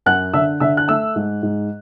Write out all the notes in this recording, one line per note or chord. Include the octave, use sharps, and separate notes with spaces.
F#2 F#5 F#6
D3 E5 E6
D3 E5 E6
F#6
A3 E5 E6
G#2
G#2